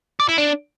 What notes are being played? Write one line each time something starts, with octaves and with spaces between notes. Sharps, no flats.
D5
E4
D4